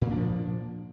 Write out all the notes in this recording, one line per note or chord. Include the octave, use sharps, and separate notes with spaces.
A#2 F3 A#3 D4